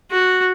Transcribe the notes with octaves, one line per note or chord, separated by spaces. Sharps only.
F#4